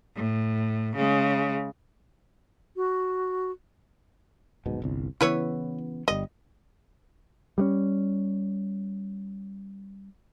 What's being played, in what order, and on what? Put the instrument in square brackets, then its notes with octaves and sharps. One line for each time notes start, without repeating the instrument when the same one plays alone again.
[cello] A2
C#3 G#3
[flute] F#4
[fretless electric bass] D1 G#2 B2
G1 C2
[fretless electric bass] C#3 E3 B3 [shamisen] E4 B4 C#5
[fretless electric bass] G1 G3 [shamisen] D#5
[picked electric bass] G3 G#3 C#4